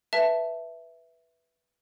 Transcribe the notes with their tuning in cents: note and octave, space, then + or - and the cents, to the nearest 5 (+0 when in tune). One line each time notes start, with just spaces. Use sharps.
B4 -5 E5 +0 A5 +0